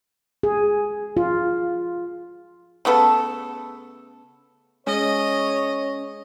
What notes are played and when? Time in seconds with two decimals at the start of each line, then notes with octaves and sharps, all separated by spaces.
0.43 G#4
1.17 F4
2.85 C#3 A3 B3 A4
4.87 G#3 C#4 C#5 D#5